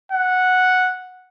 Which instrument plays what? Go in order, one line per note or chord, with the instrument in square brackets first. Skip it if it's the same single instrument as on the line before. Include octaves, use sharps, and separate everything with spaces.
[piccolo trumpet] F#5